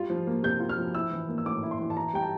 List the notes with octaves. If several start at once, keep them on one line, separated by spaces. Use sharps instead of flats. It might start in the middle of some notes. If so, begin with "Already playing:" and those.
Already playing: G3 F4
F3
A#3
C3 G6
F4
F6
F3
E4 E6
E3
A#3
E6
A2 D6
E4
C6
E3
A5
E4 A#5
G3 G5
A5